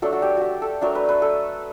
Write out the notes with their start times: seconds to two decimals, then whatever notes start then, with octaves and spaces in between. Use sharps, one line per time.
0.02 F#3 A3 D4 A4
0.13 F#4
0.22 G4
0.37 F#4 G4
0.62 A4
0.81 F#3 A3 D4 A#4
0.95 B4
1.09 B4
1.22 A4